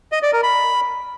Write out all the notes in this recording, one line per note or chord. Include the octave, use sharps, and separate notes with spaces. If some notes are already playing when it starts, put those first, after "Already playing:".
D#5
D5
A#4
B5